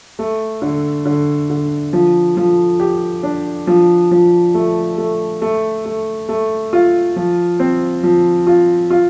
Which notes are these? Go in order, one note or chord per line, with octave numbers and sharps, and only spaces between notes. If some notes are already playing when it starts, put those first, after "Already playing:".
A3
D3
D3
D3
F3
F3
G4
D4
F3
F3
A3
A3
A3
A3
A3
F4
F3
C4
F3
F4
F4